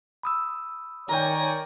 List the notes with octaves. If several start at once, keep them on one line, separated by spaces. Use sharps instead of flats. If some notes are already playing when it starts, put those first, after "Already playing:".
B5 D#6 E6
D#3 A#4 C#5 D5 G5 G#5 A#6